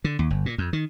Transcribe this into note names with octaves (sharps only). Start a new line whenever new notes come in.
D3
D#2
G1
A#2
F2
D#3